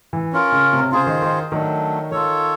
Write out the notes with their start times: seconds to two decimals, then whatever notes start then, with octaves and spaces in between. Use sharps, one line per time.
0.13 E3
0.33 C#4 F4 A#4
0.52 C#3
0.73 C3
0.92 C#3 F4 G#4 C5
1.07 D#3
1.22 D#3
1.52 D#3 F#3 A3 D4
2.11 D#3 F4 A4 C#5